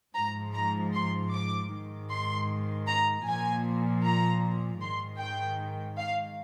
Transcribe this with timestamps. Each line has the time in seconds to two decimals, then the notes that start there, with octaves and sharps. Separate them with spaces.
0.14 G#2 F3 A#5
0.53 A#5
0.93 C6
1.31 D6
1.70 G#2 D#3
2.09 C6
2.87 A#5
3.26 A#2 F3 G#5
4.04 A#5
4.81 G#2 D#3 C6
5.20 G5
5.97 F5